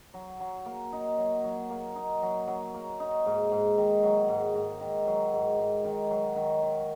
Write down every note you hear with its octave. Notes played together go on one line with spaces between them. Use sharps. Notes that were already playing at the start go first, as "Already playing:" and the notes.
F#3
F#3
A#3
D#4
F#3
F#3
A#3
D#4
F#3
F#3
A#3
D#4
G#2
G#2
D#3
F#3
G#2
G#2
D#3
F#3
G#2
G#2
D#3
F#3
D#3
D#3